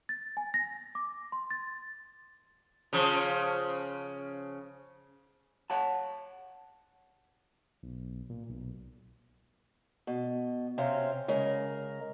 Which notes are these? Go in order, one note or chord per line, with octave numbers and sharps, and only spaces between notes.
A6
G#5
A#6
D6
C6
A6
C#3 F3
C#5 F#5 A5
B1
A#2
B1
B2
C3 C4 C#4 F5
C#3 G#3 A#4